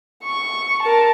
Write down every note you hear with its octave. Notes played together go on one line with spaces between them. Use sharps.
C#6
A#4 A5